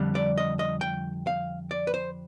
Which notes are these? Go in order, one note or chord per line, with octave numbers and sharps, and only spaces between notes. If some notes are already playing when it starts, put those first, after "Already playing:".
Already playing: F2 D3 G3
D5
D#5
D#5
G5
F5
D5
B4
C5